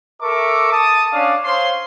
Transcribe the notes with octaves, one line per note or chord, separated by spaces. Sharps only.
A4 A#4 E5 C#6 D6
A5 D#6
C#4 D4 D5 F5
C5 C#5 F5 C6